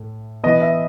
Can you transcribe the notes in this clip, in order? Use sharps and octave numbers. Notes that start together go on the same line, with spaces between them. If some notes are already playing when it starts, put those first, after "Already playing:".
Already playing: A2
E3 B3 D#5
E5